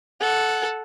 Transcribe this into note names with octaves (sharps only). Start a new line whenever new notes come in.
A4 F#5